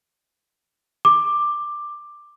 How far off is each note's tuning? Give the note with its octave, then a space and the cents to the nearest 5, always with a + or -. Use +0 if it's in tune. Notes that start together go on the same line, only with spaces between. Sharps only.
D6 +10